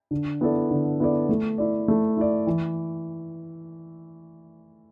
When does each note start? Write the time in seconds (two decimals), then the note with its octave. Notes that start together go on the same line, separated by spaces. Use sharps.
0.11 D3
0.41 B3 E4 A4 D5
0.71 D3
1.00 B3 E4 A4 D5
1.29 A3
1.58 E4 D5
1.88 A3
2.17 E4 D5
2.47 E3